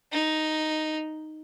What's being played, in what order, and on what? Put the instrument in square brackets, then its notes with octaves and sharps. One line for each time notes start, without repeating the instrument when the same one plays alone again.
[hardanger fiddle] D#4